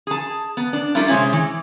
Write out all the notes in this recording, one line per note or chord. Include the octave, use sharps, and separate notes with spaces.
G#4 A5
B3
D4
G3 A3 A#3 E4 F4
C3 G#3 C4 C#4 E4
E3